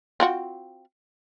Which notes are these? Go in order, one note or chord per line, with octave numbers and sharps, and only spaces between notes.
C4 F4 F#4